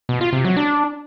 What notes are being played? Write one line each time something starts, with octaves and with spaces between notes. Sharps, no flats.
B2
F4
C3
F#3
D4